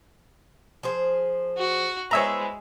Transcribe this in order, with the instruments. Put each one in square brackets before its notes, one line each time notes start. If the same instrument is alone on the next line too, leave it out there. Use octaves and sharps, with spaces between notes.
[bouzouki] F3 G#4 C5
[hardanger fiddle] F#4
[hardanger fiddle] G#3 [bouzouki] B3 E4 C5 [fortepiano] C#5 E5 A#5